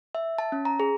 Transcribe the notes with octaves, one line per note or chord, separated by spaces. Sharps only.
E5
A5
C#4
A#5
G#4